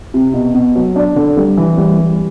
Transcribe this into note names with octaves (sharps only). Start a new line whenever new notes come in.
C3
B2
B2
F#3
D4
D3
G3
E3
G3
G3